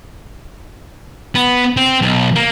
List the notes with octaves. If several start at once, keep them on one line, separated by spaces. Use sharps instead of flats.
B3
C4
B1
A#3